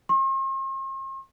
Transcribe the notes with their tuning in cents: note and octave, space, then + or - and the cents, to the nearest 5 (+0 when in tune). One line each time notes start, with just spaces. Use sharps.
C6 +45